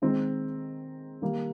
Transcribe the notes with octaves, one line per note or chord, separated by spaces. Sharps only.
D#3 G#3 C4 D#4
D#3 G3 A#3